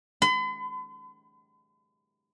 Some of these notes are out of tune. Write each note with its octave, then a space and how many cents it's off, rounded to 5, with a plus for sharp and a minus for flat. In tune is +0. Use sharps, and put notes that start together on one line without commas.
B5 +45